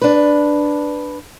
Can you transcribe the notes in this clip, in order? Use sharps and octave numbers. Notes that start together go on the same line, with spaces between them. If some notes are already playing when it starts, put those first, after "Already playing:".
D4 B4